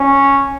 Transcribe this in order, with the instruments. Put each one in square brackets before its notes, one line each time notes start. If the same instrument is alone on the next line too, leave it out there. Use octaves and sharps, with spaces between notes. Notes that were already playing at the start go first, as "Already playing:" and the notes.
Already playing: [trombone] C#4